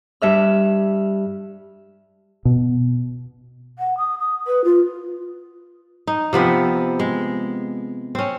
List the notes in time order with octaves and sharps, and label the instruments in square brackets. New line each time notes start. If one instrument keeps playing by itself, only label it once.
[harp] G2 E5 F6
[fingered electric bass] B2
[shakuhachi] F#5
D#6
D#6
B4
F4
[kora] D#4
C3 F3 B3 C4
G#3
C4 C#4